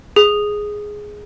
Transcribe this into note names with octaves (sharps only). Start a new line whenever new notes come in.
G#4